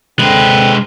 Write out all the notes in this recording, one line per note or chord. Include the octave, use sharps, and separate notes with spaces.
D3 G#3 C4 B4